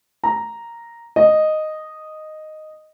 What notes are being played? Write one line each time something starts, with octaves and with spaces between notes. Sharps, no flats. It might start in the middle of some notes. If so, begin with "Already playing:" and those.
A#5
D#5